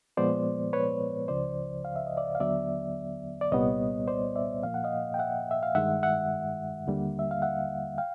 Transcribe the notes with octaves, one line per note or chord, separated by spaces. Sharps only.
A#2 F3 G#3 B3 C5 D5
B4 C#5
C#2 C#3 F3 C5 D5
F5
E5
D#5
D5 E5
F5
D#2 D3 F#3 B3 D5 E5
D5
C2 A#2 G3 B3 C#5 D#5
C5 D5
D5 E5
A#2 F3 A#3 F5
F#5
D#5 F5
G5
E5 F#5
E5
F5
G2 D#3 G#3 E5 F#5
E5 F#5
D#2 D3 G3 A#3
E5
F5
E5 F#5
F5 G5